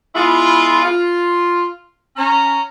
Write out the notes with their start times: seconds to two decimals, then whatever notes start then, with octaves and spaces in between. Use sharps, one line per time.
0.15 G#3 B3 E4 F4
0.84 F4
2.17 C#4 A#5